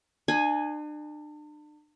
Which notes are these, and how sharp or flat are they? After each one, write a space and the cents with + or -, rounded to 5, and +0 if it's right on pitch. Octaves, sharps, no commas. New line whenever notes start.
D4 +40 G#5 +0